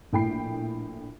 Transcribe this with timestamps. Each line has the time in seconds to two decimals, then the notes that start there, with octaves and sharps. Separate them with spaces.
0.13 A#1 A2 G5 B5 C7